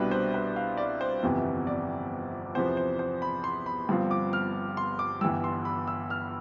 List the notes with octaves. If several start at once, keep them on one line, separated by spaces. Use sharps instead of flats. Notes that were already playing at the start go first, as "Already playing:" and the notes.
Already playing: C2 B2 G3 D4 B4
C5
B4
F5
D5
C5
G1 F2 C3 E3 B3
D5
E2 C3 F3 B3 C5
C5
C5
B5
C6
B5
G1 G2 F3 C4 F4
D6
F6
C6
D6
G1 G2 E3 G3 E6
C6
B5
E6
F6